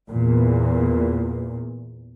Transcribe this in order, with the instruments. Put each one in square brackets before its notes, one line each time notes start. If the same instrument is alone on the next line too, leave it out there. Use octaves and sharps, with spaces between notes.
[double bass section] E2 A#2